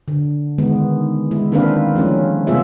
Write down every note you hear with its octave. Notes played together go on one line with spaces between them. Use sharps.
D3
D#3 G#3 B3
G#3 E4
D#3 A#3 C4 D4 B4 F5
F3 G3 A3 C#4
C3 A3 B3 F4 G#4 E5